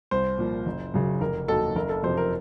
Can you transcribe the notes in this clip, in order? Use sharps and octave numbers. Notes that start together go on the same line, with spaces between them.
C2 C5
A#2 F3
F#1
F#2 C#3 F#3
F1 A#4
D#2 D#3 F#3 A4
F#1 A#4
A4
F2 C3 C5
A#4